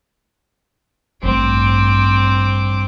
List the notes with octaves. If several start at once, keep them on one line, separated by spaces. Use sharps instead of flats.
A1 G2 C4 D6